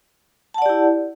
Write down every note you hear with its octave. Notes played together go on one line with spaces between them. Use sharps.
E4 G4 D5 F#5 A5